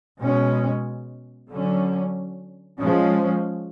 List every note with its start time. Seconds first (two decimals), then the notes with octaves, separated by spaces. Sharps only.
0.20 B2 G#3 C#4
1.51 D3 F#3 C#4
2.81 F3 G#3 C#4